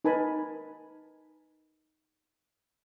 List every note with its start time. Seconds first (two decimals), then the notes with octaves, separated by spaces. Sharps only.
0.04 D#4 A#4 B4 G#5 A5 B5